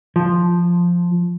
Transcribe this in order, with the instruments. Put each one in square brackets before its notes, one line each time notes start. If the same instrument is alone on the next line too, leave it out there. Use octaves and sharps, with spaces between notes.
[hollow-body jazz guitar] F3